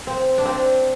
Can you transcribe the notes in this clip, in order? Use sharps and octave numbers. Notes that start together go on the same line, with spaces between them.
C4
D4
C4